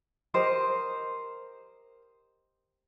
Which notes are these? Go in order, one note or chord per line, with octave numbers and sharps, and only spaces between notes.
G4 A#4 C5 D#5